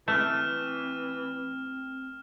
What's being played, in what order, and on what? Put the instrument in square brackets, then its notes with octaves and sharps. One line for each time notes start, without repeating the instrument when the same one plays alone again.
[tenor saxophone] E3 [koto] A3 [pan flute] C4 [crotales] F6 E7